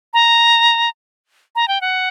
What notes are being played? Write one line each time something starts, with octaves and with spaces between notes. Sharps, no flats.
A#5
A#5
G5
F#5